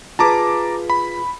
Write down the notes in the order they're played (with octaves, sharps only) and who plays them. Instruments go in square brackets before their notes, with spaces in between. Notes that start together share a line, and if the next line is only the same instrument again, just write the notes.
[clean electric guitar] F4 G#4 B4 [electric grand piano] A5 A#5 D6
[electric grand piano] B5